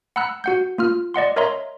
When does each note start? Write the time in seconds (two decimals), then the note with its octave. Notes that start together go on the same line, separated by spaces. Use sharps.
0.16 F#5 A#5 B5 E6 F#6
0.44 F#4 F#5 G6
0.78 A#3 F4 F6
1.14 D5 D#5 F#5 C6
1.36 A#4 C#5 D#5 E5 A#5 C6